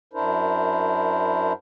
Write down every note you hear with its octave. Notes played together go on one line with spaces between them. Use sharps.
F#2 D4 E4 A#4 C5